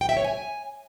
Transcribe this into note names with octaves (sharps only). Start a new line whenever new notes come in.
G5
E5
C#5
G#5